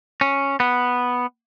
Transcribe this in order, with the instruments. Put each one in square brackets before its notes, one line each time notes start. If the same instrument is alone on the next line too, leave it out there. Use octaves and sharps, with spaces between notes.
[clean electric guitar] C#4
B3